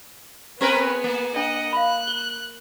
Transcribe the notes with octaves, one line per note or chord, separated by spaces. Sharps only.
B3 C4 G#4 A#4 B4
A#3
D4 D#5 F#5
F5 B5 F#6
G7